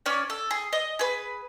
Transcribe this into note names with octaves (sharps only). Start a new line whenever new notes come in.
C#4 C#5 D5
A4
G#4
D#5
G#4 B4